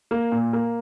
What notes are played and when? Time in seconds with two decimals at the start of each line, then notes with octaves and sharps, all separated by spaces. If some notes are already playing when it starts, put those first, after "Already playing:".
0.11 A#3
0.32 A#2
0.53 A#3